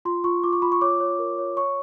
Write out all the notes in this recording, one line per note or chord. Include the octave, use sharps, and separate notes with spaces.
F4 C6
F4 C#6
F4 D6
C#6
F4 B5
C#6
C#5 D6
C#5
A#4
C#5
C#5 C#6